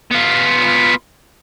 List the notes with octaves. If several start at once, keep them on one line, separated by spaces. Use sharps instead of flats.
B3 F4